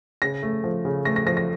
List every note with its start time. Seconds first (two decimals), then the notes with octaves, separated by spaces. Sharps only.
0.22 C#3 A#6
0.43 A3
0.64 F3
0.85 C#3
1.05 A3 A#6
1.16 A#6
1.26 F3 A#6
1.37 A#6